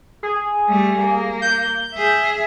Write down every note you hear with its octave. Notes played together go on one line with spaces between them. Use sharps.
G#4
G3 A3
A#3
G6
G#4 E5